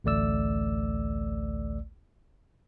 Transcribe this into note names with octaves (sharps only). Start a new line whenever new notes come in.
A1 D2 A3 D5 E6